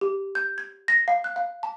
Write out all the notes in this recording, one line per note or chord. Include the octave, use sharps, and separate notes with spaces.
G4
G6
G#6
A#6
F5
F#6
F5
A5